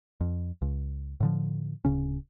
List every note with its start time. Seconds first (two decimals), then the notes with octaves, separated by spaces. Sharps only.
0.21 F2
0.62 C#2
1.20 A2 D3 F3
1.85 D1 C#3 C#4